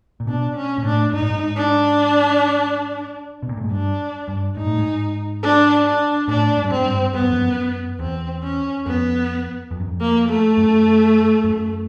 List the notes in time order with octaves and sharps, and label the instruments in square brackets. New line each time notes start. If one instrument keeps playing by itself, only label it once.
[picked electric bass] A#2
[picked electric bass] B2 [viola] D4
[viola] C#4
[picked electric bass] A#2
[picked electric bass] A2 [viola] D4
[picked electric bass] G#2 [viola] D#4
[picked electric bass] A2
G#2
[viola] D4
[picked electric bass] B2
A#2
A2
G#2
[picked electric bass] G2 [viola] D4
[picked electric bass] G2
[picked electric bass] G#2 [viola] D#4
[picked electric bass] A2
G#2
[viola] D4
D4
[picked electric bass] A2 [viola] D4
[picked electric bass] G#2
G2
[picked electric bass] G#2 [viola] C4
[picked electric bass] G2
[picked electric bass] G2 [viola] B3
[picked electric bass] F#2
F2
F#2
[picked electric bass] E2 [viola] C4
[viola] C#4
[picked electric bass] F2 [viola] B3
[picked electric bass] F2
F#2
F2
[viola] A#3
A3
[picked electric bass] F#2
F#2